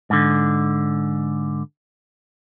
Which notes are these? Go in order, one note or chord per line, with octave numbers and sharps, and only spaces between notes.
G#2 D3